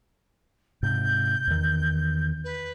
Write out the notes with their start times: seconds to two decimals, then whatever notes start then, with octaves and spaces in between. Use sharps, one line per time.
0.83 G#2 C3 G6
1.47 E2 D#3
2.44 B4